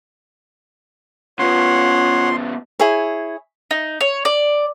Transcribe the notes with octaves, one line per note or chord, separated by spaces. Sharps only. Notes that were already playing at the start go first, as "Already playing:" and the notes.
C#3 B3 F4 C#5 F#5 C6
E4 G#4 C#5
D#4
C#5
D5